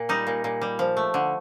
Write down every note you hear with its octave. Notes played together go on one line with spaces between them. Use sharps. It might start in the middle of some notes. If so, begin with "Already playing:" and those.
Already playing: A#2
G3 D#4
A#2
A#2
G3
F3
A3
D3